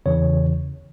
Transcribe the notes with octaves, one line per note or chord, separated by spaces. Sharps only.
E2 C#3 E3 C#5